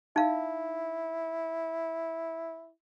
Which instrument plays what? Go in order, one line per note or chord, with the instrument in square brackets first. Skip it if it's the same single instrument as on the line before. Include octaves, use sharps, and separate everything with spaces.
[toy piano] D#4 F5 [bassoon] E4